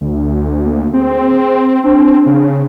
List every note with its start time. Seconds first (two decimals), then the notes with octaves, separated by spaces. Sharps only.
0.01 D2
0.65 A#3
0.94 C4 G#4
1.84 C4 D4
2.26 C#3